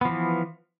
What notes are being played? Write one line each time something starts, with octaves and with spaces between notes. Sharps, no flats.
E3 F3 B3